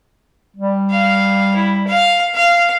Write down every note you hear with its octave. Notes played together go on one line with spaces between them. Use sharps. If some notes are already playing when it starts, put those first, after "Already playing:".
G3
F5
E4
F5
F5